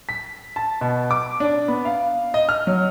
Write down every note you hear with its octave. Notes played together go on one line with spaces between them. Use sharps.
B6
A5
B2
D6
D4
B3
F5
D#5
F6
F#3